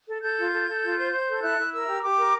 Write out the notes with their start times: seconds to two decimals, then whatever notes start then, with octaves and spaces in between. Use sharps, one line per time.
0.08 A4
0.22 A4 G6
0.37 F4
0.53 A4
0.68 A4
0.83 F4
0.98 C5
1.12 C5
1.28 A4
1.43 E4 F#6
1.58 E4
1.72 A#4 E6
1.87 G4
2.02 G4 D6
2.18 A#4